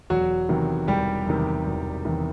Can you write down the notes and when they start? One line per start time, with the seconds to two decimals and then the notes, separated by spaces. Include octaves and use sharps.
0.10 E1 F#3 F#4
0.49 E2 C3 D#3
0.87 E1 G3 G4
1.27 E2 C3 D#3
1.67 E1
2.05 E2 C3 D#3